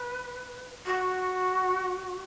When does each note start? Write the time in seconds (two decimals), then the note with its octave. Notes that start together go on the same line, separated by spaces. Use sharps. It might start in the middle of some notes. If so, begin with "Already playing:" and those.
Already playing: B4
0.85 F#4